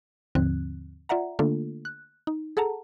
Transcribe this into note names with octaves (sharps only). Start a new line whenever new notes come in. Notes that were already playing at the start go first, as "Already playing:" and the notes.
D#2 G#2 D3 F3 C4 F#6
F4 D5 E5 F#5 A#5
D3 A3 A#3 D4 F4 A4
F#6
D#4
G#4 A4 F#5 A5 A#5